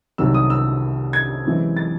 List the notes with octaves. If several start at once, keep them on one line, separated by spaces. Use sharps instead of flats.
C2 C3 D#3 F#3 E6
D#6
E6
G#6
F#2 E3 G#3 C4
A6